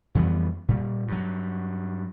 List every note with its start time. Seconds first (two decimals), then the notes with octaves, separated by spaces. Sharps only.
0.15 F2 E3 G3 B3
0.68 A#2 G3
1.08 G2 F#3